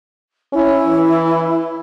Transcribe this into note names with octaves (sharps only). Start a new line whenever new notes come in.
C#4 E4
E3